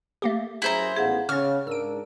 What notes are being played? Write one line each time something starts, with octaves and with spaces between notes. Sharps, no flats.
A3 A#3 G4
F#2 E4 G#4 C5 A#5
A1 G#2 B3 G#4 F5 F#5
C#3 C#6 F6 A6
G#2 D4 A#4 E6 D7